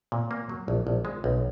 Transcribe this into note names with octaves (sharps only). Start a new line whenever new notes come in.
A#2
A#3
F#3
A#1
A#1
G#3
B1